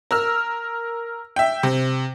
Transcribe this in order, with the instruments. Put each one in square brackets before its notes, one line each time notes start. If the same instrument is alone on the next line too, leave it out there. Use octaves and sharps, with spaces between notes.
[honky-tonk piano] A#4 E6 F6
E5 G5
C3